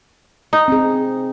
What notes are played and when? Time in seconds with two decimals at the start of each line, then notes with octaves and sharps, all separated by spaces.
0.53 D#4
0.68 C4 G#4